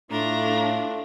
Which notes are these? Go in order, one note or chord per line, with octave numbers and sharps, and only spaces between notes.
A2 A3 D4 F4 A#5